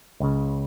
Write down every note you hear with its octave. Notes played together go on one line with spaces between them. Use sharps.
C#2 C#3